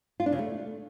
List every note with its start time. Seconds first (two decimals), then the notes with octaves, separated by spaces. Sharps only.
0.20 F4
0.26 D4
0.32 C#3
0.39 A3